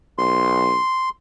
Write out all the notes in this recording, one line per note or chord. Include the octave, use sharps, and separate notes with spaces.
B1 C6